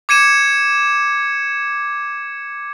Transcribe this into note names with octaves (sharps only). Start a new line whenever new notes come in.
D6 G#6 C#7 D#7 E7